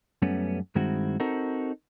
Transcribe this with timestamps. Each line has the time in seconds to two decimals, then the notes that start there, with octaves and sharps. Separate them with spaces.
0.22 F#2 G3 A3 B3 C#4
0.75 G2 D#3 G#3 C4 E4 F#4
1.20 C4 D#4 F#4 A4 A#4